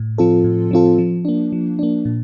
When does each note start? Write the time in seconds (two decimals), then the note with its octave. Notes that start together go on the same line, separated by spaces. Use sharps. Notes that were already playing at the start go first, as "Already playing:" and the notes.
Already playing: A2
0.18 F3 C4 F4 A4
0.44 A2
0.71 F3 C4 F4 A4
0.98 F3
1.25 A#3 D4
1.52 F3
1.79 A#3 D4
2.05 A#2